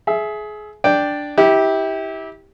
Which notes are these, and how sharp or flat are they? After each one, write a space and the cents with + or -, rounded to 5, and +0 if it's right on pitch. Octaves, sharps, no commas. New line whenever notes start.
G#4 +25 E5 +5
D4 +0 D5 +0 G5 +0
E4 -30 G4 +0